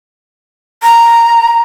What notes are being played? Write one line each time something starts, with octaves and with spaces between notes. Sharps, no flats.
A#5